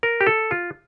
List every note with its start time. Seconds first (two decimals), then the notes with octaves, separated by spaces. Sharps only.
0.03 A#4
0.21 G4
0.27 A4
0.51 F4